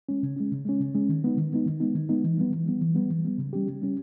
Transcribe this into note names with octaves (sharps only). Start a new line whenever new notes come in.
G#3 C#4
C#3
G#3 C#4
C#3
G#3 C#4
C#3
G#3 C#4
D#3
G#3 B3 D#4
D#3
G#3 B3 D#4
D#3
G#3 B3 D#4
D#3
G#3 B3 D#4
E3
G3 B3
E3
G3 B3
E3
G3 B3
E3
G3 B3
C#3
G3 C#4 G4
C#3
G3 C#4 G4